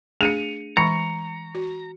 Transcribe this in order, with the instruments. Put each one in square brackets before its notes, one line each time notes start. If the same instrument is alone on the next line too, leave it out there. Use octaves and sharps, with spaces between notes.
[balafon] A3 D4 G#4 [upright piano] C#7 D#7 F7
[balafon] E3 G#3 [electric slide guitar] A#5 [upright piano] C#6 C#7
[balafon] F#4